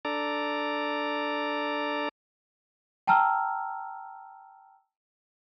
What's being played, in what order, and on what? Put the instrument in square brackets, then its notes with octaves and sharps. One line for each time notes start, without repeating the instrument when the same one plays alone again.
[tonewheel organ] D4 A4 D5 A#5
[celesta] G5 A5 A#5 E6 F6